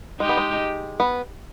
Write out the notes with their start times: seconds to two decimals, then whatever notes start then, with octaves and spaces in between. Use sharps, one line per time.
0.20 G#3 D#4 G4
0.29 B3
0.37 G#3
1.00 B3